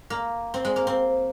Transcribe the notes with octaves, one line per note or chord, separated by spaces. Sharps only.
A#3
C4
G#3
A#3
C4